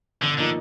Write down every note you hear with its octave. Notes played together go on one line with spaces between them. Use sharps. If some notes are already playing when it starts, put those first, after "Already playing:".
G1 D3
D3 F3 A#3 D#4